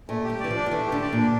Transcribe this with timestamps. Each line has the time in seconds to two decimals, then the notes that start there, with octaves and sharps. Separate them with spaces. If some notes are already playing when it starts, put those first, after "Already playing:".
0.09 A#2 A3
0.25 G4
0.30 G3
0.40 E3 D5
0.51 F3
0.56 D4
0.66 F3
0.71 E3 A3
0.86 G4
0.92 D3
1.02 D5
1.13 A#2
1.18 D4